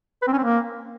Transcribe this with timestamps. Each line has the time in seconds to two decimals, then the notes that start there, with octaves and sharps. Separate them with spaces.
0.22 B4
0.27 C4
0.33 C#4
0.38 C4
0.43 A#3